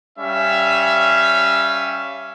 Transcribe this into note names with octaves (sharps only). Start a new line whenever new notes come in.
G3 C#4 E5 F5